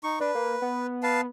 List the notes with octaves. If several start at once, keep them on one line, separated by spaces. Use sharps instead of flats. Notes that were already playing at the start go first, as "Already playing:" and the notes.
D#4 C#6
D4 B4
A#3
B3
B4 F5 A5